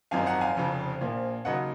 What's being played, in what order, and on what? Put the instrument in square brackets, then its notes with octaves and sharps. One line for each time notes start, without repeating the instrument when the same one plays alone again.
[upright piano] G#1 F#2 F3 C4 D#4 F5 G#5
F#5 A#5
F5 G#5
F1 F2 C#3 F3
A#1 A#2 F3
D#2 C#3 F#3 D#5 F#5